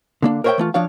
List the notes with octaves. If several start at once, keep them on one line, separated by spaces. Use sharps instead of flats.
D3 A#3 D4
A#4 C5 C#5 D#5 E5 G5
E3 A3 F4
F3 D4 C#5 F5